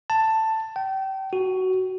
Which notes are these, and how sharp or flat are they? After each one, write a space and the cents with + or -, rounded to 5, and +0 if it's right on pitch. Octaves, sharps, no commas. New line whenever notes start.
A5 +10
G5 -30
F#4 +10